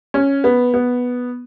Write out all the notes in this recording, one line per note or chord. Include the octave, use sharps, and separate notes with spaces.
C#4
B3
B3